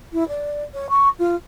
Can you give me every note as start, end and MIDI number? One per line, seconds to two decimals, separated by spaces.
0.13 0.27 64
0.28 0.63 74
0.74 0.87 73
0.90 1.09 85
1.19 1.35 65